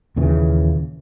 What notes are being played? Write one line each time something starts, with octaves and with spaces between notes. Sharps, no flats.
D#2 A#2 C#3 E3